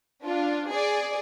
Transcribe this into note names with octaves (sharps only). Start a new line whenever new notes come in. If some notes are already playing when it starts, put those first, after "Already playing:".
D4 F4
G#4 D5